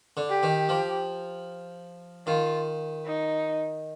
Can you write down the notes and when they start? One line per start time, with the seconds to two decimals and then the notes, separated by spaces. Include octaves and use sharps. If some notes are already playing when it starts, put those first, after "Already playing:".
0.17 D3
0.30 G4
0.43 D#3
0.69 F3
2.27 D#3 F4
3.06 D#4